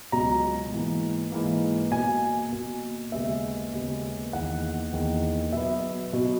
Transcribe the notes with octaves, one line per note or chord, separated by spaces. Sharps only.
C#2 B2 F#3 A#5
G#2 E3 A#3
G#2 E3 A#3
B2 A#3 G#5
B2 A#3
D#2 C#3 G#3 B3 E5
D#2 C#3 G#3 B3
E2 D#3 A#3 F#5
E2 D#3 A#3
B2 F#3 B3 E5
B2 F#3 B3